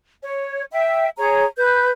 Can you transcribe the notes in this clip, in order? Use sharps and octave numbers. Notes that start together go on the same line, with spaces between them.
C#5
E5 G5
G#4 C#5 A#5
B4 G6